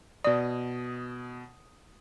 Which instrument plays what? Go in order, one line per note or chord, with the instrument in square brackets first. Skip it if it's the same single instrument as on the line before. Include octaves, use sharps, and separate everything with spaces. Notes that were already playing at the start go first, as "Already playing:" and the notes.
[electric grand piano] B2 D#6 [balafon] D5